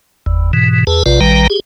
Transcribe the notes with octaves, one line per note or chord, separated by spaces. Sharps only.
G1 E2
G#2 B2 E3
E2 G#4 B4 A5
A#1 C3 F4 B4 D5
A#1 D#3 G3 B4 G5 A#5
G4 G#4